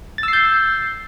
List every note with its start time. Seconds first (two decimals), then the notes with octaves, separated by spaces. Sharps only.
0.18 A6
0.23 E6
0.28 C7
0.33 G6